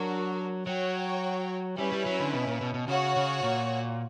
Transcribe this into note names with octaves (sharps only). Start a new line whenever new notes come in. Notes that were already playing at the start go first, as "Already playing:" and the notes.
Already playing: F#3 D4 F#4 A#4
F#3 F#4 C#5 G5
G3 C#4 E4 B4
G3
F#3
D3
B2
A#2
B2
B2
C#3 F#4 C#5 F#5
C#3
A#2